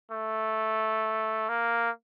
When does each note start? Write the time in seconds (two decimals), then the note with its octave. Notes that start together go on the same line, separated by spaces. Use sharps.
0.11 A3
1.49 A#3